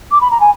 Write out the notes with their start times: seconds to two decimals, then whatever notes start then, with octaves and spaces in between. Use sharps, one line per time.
0.11 D6
0.21 B5
0.31 A#5
0.40 G#5